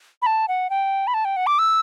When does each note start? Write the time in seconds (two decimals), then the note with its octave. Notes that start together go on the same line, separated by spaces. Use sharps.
0.22 B5
0.26 A5
0.48 F#5
0.70 G5
1.07 B5
1.14 A5
1.25 G5
1.36 F#5
1.47 D6
1.59 E6